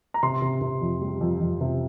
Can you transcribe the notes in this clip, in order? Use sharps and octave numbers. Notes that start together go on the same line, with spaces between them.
A#5
C3 C6
C3
C3
F2
G3
F2
F2
C3